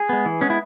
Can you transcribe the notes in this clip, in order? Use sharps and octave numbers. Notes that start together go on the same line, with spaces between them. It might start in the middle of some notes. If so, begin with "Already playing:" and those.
Already playing: G#4
G#3 B3
E3
G#3 B3 C#4
E4